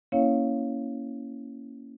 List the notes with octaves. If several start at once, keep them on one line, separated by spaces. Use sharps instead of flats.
A#3 C#4 E4 C#5 F5